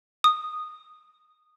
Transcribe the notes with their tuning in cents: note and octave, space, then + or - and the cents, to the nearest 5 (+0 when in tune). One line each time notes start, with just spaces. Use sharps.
D#6 -10